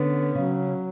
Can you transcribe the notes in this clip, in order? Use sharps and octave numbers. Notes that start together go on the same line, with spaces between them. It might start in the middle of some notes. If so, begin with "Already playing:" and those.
Already playing: D3 B3 C#4
C#3 F#3